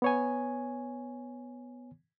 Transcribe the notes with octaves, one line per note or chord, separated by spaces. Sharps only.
B3 C#5 G#5